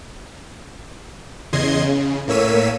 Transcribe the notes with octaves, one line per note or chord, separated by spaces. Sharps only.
E2 C#3 D#5 C6 G#6
C#3
A2 A#3 C#5 E6 B6 D#7